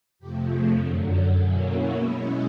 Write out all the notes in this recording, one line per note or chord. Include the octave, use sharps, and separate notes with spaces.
F2 C3 F3 A3 G4
G#4
F#2 D3 F#3 A4
A4
B2 F#3 A#3 C#4 E4 G#4
F#4
B2 G#3 C#4 E4